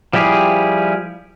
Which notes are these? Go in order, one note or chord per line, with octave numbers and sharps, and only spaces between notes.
F3 G3 E4 G4 G#4